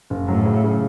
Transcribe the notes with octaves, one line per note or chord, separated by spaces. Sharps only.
F#1
A2 F#3
C#3
C#3